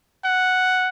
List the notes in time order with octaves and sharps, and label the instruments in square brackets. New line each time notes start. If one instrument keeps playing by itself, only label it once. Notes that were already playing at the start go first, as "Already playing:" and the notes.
[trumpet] F#5